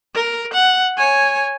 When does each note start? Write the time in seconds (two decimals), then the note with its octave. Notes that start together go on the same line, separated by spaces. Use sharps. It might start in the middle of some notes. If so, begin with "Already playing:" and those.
0.14 A#4
0.54 F#5
0.97 C#5 G#5